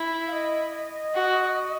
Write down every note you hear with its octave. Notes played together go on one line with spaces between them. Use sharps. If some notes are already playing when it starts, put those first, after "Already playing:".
Already playing: E4
F5
D#5
D#5
F#4